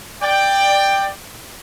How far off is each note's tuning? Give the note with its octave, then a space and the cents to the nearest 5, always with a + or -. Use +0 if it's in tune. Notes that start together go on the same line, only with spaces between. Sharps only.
D5 +15 G5 +5